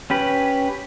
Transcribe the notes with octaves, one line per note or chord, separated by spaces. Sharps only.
C#4 G4 B4